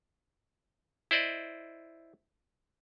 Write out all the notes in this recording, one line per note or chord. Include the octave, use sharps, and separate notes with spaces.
E4 C5 D5 D#5